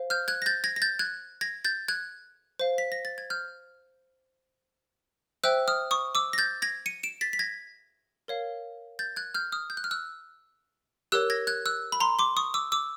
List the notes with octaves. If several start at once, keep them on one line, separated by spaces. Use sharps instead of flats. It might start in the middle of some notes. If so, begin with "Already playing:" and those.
Already playing: C5 F5
F6 G6
F#6 G#6
A#6
G6 A6
G#6 A#6
A#6
G6 A6
F#6 G#6
G#6 A#6
G6 A6
F#6 G#6
C5 F5
B6
A#6
A6
G#6
F6 G6
C5 E5 G5 E6 F#6
D#6 F6
C#6 D#6
D6 E6
A#6
G6 A6
G#6 A#6
C#7 D#7
D7 E7
A6 B6
B6
G#6 A#6
A#4 C#5 F5
G6 A6
F#6 G#6
F6 G6
D#6 F6
G6
F#6
F6
E6 F#6
G4 A#4 C#5 E6 F#6
G#6 A#6
F#6 G#6
E6 F#6
B5
A#5 C6
C6 D6
C#6 D#6
D6 E6
D6 E6